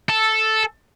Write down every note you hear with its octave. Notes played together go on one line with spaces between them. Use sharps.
A4